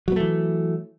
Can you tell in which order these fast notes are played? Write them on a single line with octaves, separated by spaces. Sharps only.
F#3 B3 A3 E3